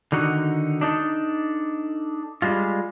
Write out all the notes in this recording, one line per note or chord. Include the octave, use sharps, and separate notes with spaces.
D3 D#3 D#4 F#4
D4 D#4 A4
G3 G#3 F4